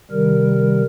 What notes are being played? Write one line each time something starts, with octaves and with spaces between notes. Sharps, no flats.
C3 D#3 G3 A#4